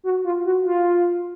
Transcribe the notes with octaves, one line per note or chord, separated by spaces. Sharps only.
F#4
F4
F#4
F4